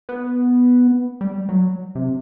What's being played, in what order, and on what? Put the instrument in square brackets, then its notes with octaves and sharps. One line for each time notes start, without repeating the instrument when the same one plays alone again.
[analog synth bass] B3
G3
F#3
C3